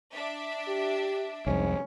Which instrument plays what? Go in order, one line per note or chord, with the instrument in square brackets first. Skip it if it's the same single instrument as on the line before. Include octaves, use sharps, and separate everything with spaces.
[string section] D4 E5
[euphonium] G4
[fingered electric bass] C2 F2 [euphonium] G#2 [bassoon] C#4